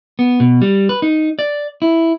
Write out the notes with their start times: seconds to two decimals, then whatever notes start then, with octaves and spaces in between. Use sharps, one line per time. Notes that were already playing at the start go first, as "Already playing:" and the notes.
0.19 B3
0.40 B2
0.62 G3
0.89 B4
1.02 D#4
1.39 D5
1.82 E4